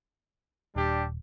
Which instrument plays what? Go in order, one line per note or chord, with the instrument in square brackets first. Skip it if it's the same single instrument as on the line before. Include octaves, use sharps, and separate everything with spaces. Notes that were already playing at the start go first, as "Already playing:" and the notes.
[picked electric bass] D#1 [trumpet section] G3 D4 G4